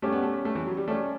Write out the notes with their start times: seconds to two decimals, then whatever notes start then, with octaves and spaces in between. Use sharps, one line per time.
0.02 G3 A3 C#4 G4
0.12 B3
0.23 A3
0.45 A3
0.55 E3
0.66 F#3
0.77 G3
0.88 G3 A3 C#4 G4 D5